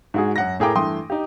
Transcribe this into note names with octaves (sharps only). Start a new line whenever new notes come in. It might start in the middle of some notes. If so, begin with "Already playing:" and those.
G#2 F#4 G#4
F#2 F#5 A#6
A2 G#4 A#4 G5 D6
G2 E3 A3 G5 C6 D#6
D#4 G4